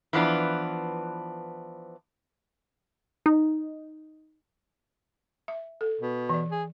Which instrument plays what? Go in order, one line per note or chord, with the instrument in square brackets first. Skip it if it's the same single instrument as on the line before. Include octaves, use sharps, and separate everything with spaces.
[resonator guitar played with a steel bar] E3 F3 B3 D4
[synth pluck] D#4
[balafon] E5
A4
[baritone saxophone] B2
[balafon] E3 D5
[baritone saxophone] G#4